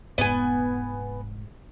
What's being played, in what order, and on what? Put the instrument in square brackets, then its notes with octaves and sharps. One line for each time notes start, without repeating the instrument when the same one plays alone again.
[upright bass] F1 G#2 [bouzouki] B3 G#5